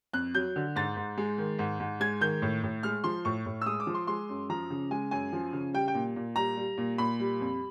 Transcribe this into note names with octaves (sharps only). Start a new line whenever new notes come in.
F2 F#6
F#3 G6
D3
G#2 A6
G#2
G#3
D#3
G#2
G#2
G#3 G#6
D#3 G6
A2
A2
G#3 F6
F3 C6
A2 C#6
A2
E6
G#3 D#6
D6
F3
C6
G#3 C6
F#2
F3 A#5
C#3
G#3 G#5
F#2 G#5
F3
C#3
G3 G5
G5
A#2
A#2
G3 A#5
G3
A#2
A#2 B5
G3
F2